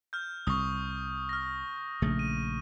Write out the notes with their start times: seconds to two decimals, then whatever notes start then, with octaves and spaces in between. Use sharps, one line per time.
0.13 F6 G6
0.47 C2 C#6 D#6
1.29 F6 A#6
2.02 A#1 C#3 A3
2.19 D#7